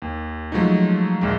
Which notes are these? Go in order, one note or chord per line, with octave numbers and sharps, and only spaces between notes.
D#2
F3 F#3 G#3 A3 D#4
A#1 D#2 G#3